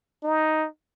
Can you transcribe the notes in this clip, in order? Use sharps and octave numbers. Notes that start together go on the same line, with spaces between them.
D#4